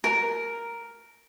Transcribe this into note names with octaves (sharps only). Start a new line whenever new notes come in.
A#4